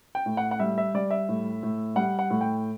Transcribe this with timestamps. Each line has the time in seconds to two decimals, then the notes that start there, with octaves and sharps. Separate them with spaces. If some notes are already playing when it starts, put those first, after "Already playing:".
0.15 G5
0.26 A2
0.37 F#5
0.51 F#5
0.59 G3 E5
0.78 E5
0.94 G3 D5
1.11 E5
1.29 A2
1.63 A2
1.96 G3 F#5
2.19 F#5
2.30 A2
2.41 G5